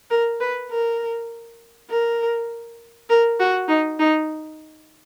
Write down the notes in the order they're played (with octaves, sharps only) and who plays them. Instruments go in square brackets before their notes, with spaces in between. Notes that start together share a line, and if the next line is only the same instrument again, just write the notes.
[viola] A#4
B4
A#4
A#4
A#4
F#4
D#4
D#4